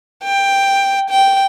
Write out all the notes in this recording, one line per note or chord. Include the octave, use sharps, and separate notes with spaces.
G5
G5